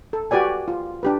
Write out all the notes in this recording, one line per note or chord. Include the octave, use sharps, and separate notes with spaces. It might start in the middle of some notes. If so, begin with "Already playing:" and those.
A4
F#4 G4 B4 D5 G#5
F4
D4 G4 B4